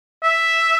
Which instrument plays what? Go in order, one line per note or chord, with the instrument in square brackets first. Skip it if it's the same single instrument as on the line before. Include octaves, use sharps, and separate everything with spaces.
[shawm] E5